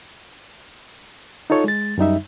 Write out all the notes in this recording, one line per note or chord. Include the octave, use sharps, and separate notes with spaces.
D#4 F4 A4 C#5
G#3 A6
F#2 G3 D#4 E5